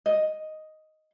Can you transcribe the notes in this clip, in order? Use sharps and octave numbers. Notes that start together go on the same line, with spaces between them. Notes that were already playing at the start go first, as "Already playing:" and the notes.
D#5